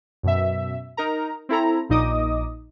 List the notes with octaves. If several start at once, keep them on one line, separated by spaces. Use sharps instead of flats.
F#2 B2 E5
D#4 A#4 A#5
C4 E4 A4 A#5
A#1 A#2 D#4 D#5 D6 D#6